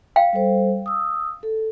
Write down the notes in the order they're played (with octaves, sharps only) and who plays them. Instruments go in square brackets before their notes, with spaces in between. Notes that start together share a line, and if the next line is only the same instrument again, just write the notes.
[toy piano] F5 G5
[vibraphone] G3 A4 C5
D#6 E6
A4